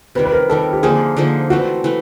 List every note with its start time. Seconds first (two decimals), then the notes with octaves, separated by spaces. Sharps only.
0.15 C3 D#3 G3 B4
0.25 B4
0.33 A#4
0.49 C3 D#3 G3 A4
0.73 G4
0.83 D3 F3 A#3 D#4 G#4
1.17 D3 F3 A#3 D#4
1.50 E3 A3 C4 F#4
1.84 E3 A3